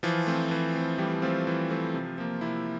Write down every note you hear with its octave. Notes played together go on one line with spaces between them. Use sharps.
E3 F3 F4
A3 C4
E3
A3 C4
E3 G3 G4
F3 A3 C4 F4
E3
A3 C4
C3
F3 A#3
C3 E4